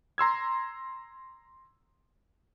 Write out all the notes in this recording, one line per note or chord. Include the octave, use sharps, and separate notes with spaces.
A#5 C6 E6 G#6